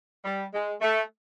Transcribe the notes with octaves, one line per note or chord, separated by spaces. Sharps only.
G3
G#3
A3